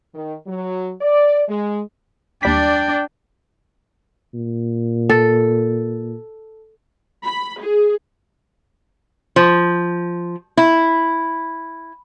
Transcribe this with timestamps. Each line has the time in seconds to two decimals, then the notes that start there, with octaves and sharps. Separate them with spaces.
0.15 D#3
0.47 F#3
1.01 D5
1.48 G#3
2.43 D#2 G3 D4 D5 G5 B6
4.34 A#2
5.10 A4
7.25 B5
7.60 G#4
9.36 F3
10.57 E4